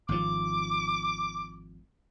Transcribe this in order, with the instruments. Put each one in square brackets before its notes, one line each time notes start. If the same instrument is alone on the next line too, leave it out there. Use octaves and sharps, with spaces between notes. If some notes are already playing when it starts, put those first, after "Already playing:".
[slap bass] G#1 F3 [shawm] D6